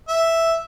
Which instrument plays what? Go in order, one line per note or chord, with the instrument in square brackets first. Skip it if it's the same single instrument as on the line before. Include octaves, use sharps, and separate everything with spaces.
[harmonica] E5